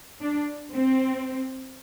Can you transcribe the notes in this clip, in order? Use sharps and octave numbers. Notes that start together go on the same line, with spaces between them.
D4
C4